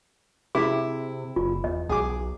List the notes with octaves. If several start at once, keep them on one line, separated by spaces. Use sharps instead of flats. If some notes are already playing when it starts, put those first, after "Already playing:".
C3 E4 G#4
F#1 F4
E2 D#5
B1 G#4 D6